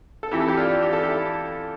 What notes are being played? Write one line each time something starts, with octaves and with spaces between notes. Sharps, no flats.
A4
F2 E3 E4 G4
A4
G4
D4 F4
G4
A4
E4 G4